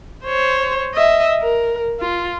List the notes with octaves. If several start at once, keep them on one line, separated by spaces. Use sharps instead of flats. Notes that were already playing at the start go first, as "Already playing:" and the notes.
C5 C#5
D#5 E5
A#4
F4